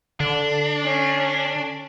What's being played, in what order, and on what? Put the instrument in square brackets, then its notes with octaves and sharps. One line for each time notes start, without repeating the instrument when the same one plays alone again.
[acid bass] D3 [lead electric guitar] D4
[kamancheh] C#4